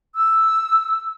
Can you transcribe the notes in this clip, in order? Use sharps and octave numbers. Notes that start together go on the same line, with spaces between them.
E6